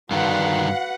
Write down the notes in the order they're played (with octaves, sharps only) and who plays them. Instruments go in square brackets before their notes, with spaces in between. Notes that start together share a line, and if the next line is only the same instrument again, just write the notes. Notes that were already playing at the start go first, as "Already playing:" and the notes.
[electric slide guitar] G2 D3 D#3 [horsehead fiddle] F#4 B4 [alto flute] F5 [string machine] F#5